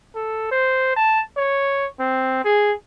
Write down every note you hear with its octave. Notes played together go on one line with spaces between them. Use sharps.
A4
C5
A5
C#5
C4
G#4